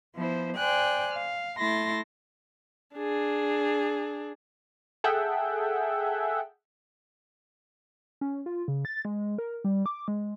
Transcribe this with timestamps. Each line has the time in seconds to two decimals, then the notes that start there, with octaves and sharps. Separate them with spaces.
0.15 F3 B3 E4 C5
0.57 C5 D5 G5 G#5 F#6
1.12 F5
1.59 A3 E4 C6 A6 A#6
2.96 D4 G#4
5.04 G#4 A4 E5 F#5 G5
8.21 C#4
8.46 F4
8.68 C#3
8.85 A6
9.05 G#3
9.38 A#4
9.64 G3
9.86 D6
10.08 G#3